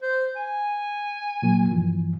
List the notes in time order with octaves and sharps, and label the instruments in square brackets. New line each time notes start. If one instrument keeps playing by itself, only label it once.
[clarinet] C5
G#5
[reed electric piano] A#2 F#3 A#3
G2 E3 F3